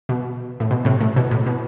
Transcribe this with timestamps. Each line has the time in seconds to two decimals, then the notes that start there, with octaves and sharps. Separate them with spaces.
0.09 B2
0.60 A2
0.71 B2
0.85 A2 C3
1.01 A2
1.16 B2
1.31 A2
1.46 B2